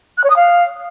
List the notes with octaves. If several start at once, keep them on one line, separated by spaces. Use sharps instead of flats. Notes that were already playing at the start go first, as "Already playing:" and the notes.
F#6
C#5
D#6
F5